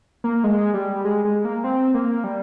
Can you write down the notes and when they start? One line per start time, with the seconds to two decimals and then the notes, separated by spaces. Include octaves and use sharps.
0.24 A#3
0.44 G#3
0.74 G3
1.05 G#3
1.25 G#3
1.45 A#3
1.64 C4
1.94 A#3
2.24 G3